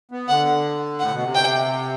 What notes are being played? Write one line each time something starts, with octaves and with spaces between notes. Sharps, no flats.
B3
D3 F#5
A2 F#5
B2
C3
G5